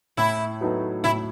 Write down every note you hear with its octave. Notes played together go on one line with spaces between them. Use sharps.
A2 E4
F#3 B3 D#4 A4
A2 E4